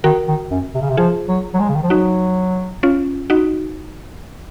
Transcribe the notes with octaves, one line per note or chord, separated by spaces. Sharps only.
D#3 F#4 A#4
D#3
F#2
C3
C#3
C3
F3 F4 G#4
F#3
F#3
G#3
C#3
D#3
F3
F#3 D#4 F#4
C#4 F4
D#4 F#4